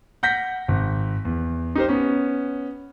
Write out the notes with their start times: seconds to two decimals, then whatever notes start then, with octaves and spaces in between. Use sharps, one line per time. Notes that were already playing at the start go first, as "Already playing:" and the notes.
0.23 F#5 G6 A#6 B6
0.68 G#1
1.25 E2
1.75 D#4 G4 A#4 C5
1.89 B3 C#4